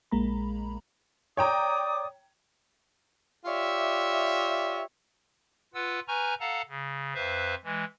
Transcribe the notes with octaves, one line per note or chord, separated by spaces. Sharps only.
A#1 G#3 A#3 A#5 B5
C#5 D5 G5 A#5 D6 D#6
F4 G4 C#5 D5 E5
F4 B4 F#5 E6
B4 G#5 A#5 C#6 F6 G6
A4 F5 F#5 A5 A#5
C#3
F2 B4 C5 E5 F5
E3 G#3